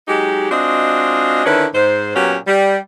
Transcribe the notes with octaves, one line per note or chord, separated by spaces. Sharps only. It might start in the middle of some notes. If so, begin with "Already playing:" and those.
F#3 G#3 D#4 G4
G#3 C4 D4 F4 F#4 D#5
D3 D#3 C#4 D4 E4 B4
G#2 C5
A#2 F#3 B3 C#4 G4
G3